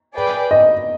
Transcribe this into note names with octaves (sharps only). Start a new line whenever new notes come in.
G#4 B4 D5 G5
D#5